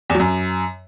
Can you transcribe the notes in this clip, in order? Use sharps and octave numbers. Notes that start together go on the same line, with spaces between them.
E2
F#3
F#2